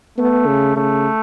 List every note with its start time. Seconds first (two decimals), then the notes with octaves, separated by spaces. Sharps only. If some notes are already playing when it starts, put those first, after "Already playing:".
0.18 A3 B3
0.47 C#3
0.76 C#3 A3